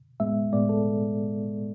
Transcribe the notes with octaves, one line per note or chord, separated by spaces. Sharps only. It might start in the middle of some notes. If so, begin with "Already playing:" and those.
A2 G#3 B3 E5
A2 G#3 B3 D5
A4